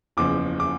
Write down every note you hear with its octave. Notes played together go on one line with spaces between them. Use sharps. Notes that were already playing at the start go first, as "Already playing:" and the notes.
F#1 E2 C#3 F3 D6
D6